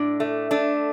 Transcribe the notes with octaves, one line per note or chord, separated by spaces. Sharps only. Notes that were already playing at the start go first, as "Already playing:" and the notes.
Already playing: A2 D4
A3
A3 D4